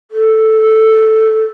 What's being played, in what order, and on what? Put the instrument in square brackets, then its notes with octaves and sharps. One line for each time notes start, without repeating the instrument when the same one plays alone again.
[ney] A4